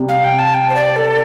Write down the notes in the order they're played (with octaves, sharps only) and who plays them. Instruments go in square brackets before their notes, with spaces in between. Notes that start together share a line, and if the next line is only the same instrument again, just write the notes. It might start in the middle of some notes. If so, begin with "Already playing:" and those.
Already playing: [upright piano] C3 G3
[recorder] F5
G5
A5
G5
C5
D5
A4